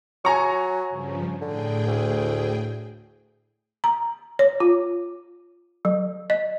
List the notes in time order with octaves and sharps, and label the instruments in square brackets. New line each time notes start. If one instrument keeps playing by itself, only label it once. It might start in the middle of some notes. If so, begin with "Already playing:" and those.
[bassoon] F#3 [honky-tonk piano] G#5 A#5 C#6
[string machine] G2 C#3 F3
[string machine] A2 G#4 G5 [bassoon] D3
[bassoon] D2
[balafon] A#5
C#5
F4
F#3
D#5